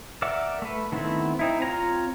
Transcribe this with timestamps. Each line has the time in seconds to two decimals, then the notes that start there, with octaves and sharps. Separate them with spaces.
0.22 A#4 D5 E5 F#5 D6
0.62 A3 B4
0.92 D#3 A3 B3 C4 E4
1.39 C4 D#4 E4
1.62 C4 F4 C#5 A#5